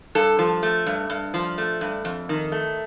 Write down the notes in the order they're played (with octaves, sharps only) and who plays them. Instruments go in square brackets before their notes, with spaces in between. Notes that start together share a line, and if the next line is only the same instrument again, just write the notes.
[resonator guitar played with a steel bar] G2 A4
F3
A3
G2
G2
F3
A3
G2
F2
D#3
A3